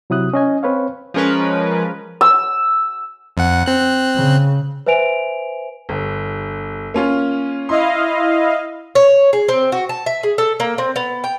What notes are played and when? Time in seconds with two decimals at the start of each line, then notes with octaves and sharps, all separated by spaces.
0.10 C3 F#3 E4 D#6 F#6
0.34 C#4 D#5 G#5
0.63 C4 B4 C#5 F5
1.14 F3 G#3 C#4 A#4 B4
2.21 E6
3.37 F2 F#5
3.66 C4 F#6
4.16 C#3
4.87 B4 C5 E5 G#5 D7 F7
5.89 G1
6.94 A#3 C#4 F4
7.69 E4 D#5 F5 C6
8.95 C#5
9.33 G#4
9.49 C4
9.72 F#4
9.89 A5
10.06 E5
10.23 G#4
10.38 A4
10.60 A#3
10.78 C4
10.96 B3
11.24 G5